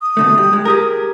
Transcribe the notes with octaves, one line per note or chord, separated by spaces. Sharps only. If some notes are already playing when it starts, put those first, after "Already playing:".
D#6
B2 D3 A3
G3
G#3
G4 G#4 A#4